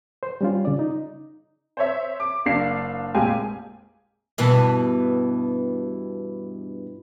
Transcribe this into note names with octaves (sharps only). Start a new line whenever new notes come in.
C5
G3 C#4 F4
C#3 D5
D#4
C5 C#5 E5
D6
F#1 D4 F5 C7
F1 A#1 G#3 G4 F5 G#5
G2 B2 E3